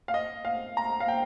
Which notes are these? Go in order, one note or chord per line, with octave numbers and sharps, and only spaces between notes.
F5
D#5
F5
A#5
F5
G5